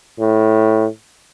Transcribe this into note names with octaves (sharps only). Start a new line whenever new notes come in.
A2